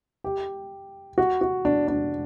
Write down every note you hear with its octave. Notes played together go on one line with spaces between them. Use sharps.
G4
F#4
F#4
D4
D4